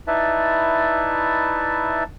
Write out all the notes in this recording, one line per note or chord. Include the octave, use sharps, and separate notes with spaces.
D#4 E4 B4 D5 E5 A5